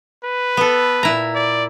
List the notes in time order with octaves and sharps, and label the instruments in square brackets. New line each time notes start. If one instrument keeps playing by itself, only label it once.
[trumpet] B4
[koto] B3 A4
A#2 E4 A#5
[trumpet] D5